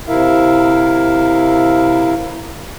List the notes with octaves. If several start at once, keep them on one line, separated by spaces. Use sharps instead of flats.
C3 E4 A#4 E5 F5